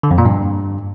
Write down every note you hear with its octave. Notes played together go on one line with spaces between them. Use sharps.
D3
F2
A#2
G2